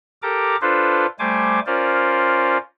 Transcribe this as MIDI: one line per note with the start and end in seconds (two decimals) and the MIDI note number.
0.22 0.56 67
0.22 0.56 69
0.22 0.56 70
0.22 0.56 82
0.22 0.56 86
0.62 1.06 62
0.62 1.06 65
0.62 1.06 69
0.62 1.06 71
0.62 1.06 72
1.19 1.60 55
1.19 1.60 57
1.19 1.60 72
1.19 1.60 80
1.19 1.60 86
1.66 2.58 61
1.66 2.58 65
1.66 2.58 70
1.66 2.58 72
1.66 2.58 74